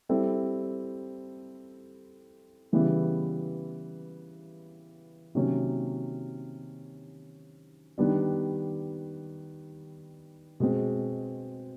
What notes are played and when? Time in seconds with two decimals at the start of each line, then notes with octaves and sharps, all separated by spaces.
0.09 G3 C4 E4 A4
2.72 C#3 E3 G3 B3 E4
5.35 C3 D#3 F#3 A#3 C#4
7.98 D#3 G3 B3 D4
10.60 B2 G#3 C4